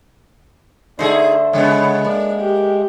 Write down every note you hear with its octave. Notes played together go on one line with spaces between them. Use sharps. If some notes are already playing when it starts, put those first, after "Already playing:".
D3 A3 D#4 G#4 C5
C#3 G#3 B3 C#5
A#3 D4
G4